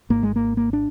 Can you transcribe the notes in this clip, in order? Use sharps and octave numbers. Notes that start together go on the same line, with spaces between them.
G#1 G#2 A#3
G#3
A#3
A#3
D4